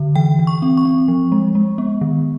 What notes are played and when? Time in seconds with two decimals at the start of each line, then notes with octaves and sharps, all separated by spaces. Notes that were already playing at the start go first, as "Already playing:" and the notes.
Already playing: D3
0.16 E3 G5
0.39 E3
0.47 C#6
0.62 C4
0.77 C#6
0.85 C4
1.08 F3
1.32 G#3
1.55 G#3
1.78 B3
2.01 D#3